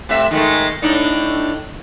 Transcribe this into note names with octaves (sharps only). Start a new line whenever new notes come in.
C3 A3 E5
D#3 G#3 A3
A2 D4 D#4